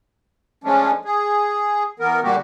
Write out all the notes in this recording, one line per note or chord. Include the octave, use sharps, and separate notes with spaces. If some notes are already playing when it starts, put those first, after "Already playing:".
F3 G#3 A3 C#4 D4
G#4
E3 B3 A#4
A#2 D3 G3 A#3 F#4 G4